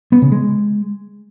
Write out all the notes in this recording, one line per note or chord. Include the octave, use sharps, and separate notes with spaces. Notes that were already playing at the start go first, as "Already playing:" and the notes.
B3
C#3
G#3